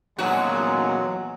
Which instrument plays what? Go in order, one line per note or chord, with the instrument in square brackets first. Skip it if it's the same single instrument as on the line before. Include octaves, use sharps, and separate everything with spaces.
[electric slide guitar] E2 A#2 [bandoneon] F#3 [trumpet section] G#3 [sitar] F#4